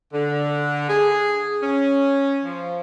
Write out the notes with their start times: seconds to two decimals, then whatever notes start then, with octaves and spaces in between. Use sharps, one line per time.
0.13 D3
0.89 G#4
1.62 C#4
2.44 F3